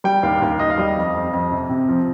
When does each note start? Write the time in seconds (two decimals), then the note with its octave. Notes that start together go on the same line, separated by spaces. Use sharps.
0.04 G3 G5
0.23 D#2 F5
0.42 D#2 F5
0.59 D#2 D#5
0.70 F5
0.78 G3 D#5
0.96 F2
1.14 F2
1.33 F2
1.52 C3
1.69 C3
1.89 F3